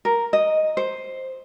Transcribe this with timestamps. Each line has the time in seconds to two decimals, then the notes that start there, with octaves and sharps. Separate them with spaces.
0.05 A#4
0.33 D#5
0.77 C5